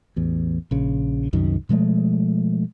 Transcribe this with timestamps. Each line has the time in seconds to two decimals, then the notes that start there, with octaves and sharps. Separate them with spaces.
0.16 A1 E2
0.71 A#1 C#3
1.33 C2 F#2 D#3
1.69 B2 F3 G#3 A3